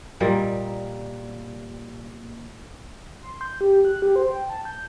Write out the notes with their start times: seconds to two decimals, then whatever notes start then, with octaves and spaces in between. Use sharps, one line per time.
0.20 A#2 G3 A#3 D#5
3.23 C6
3.41 G6
3.61 G4
3.85 F#6
4.02 G4
4.16 C5
4.31 G5
4.50 A5
4.65 G6